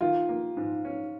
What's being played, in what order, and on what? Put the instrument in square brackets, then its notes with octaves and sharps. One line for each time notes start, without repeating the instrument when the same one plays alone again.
[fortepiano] D#3 [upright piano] F4
[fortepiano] A#3
G#2
C#4